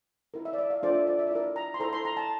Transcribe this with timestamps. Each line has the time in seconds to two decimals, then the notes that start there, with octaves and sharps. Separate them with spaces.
0.34 E4 A#4
0.45 E5
0.53 D5
0.58 E5
0.70 F5
0.83 D4 F4 A4 C5 D5
0.94 E5
1.07 D5
1.19 E5
1.27 D5
1.31 E4 A#4 E5
1.56 A#5
1.74 C6
1.80 E4 A4 C5 A#5
1.93 C6
2.05 A#5
2.17 A5